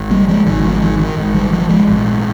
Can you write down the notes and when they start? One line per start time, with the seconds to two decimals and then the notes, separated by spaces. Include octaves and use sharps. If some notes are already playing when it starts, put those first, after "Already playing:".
Already playing: G#1 G#2
0.11 G3 A#3
0.28 F3 G#3
0.46 G#1 G#2 D#3
0.64 F3
0.82 D#3
0.99 D#3
1.17 G#1 G#2
1.34 D#3 G3
1.52 F3
1.69 F3 G#3
1.87 A#1 G#2